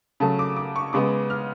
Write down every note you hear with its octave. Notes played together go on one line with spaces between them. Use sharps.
C#3 F#3 A3 A5
D6
D6
C#6
C#3 G#3 B3 D6
F6